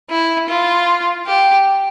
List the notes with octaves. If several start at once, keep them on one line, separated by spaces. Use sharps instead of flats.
E4
F4
G4